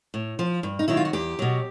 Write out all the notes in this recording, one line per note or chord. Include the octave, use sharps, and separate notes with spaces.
A2
F3
G2
D#4
D#3 F#3 E4
F4
F#4
E2 G4
B2 F#3